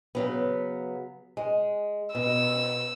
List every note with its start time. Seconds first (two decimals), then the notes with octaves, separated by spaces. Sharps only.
0.15 C#3 F#3 B3
1.37 G#3
2.15 B2 E6